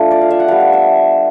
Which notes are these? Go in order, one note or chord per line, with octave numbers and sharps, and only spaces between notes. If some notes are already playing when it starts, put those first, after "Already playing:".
Already playing: A3 D4 F4
D5
F5
E5
F#5
G3 B3 D4 F5
E5
E5